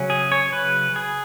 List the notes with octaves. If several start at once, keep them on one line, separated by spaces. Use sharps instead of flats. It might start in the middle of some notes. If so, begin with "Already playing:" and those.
Already playing: C#3 F#3 C#4
G#4
C#5
B4
G#4